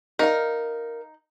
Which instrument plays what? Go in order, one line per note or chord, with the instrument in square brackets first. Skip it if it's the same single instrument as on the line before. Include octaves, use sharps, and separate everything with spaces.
[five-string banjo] D#4 [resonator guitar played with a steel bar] A#4 F5